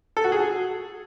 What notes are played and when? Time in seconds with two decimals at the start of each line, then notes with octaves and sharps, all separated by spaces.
0.17 A4
0.24 F#4
0.32 G#4